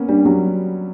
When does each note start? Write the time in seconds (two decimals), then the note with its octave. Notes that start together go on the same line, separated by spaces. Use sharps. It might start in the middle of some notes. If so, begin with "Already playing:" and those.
Already playing: A#3 B3 C#4
0.09 G3 D4
0.25 F#3 G4